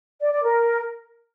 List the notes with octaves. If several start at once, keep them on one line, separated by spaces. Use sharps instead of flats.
D5
D5
A#4